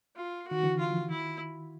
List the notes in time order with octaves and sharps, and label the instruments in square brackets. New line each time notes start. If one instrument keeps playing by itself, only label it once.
[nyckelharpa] F4
[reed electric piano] D#3 [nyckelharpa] F#4
[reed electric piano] D3 E3
[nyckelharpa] F4
[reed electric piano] F3
E3
[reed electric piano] D#3 [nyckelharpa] E4